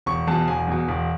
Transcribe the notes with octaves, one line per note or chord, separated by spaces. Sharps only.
E1 C#6
E2 B2 A5
E1 G#5
E2 B2
E1